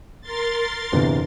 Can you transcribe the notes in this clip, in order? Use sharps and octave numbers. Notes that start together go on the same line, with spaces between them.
A#4 C6 A6
G1 E2 C3